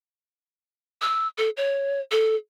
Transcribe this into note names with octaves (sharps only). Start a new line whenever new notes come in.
E6
A4
C#5
A4